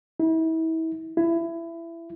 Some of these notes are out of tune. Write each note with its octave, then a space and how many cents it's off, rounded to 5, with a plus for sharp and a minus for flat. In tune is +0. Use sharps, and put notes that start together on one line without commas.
E4 -35
E4 +20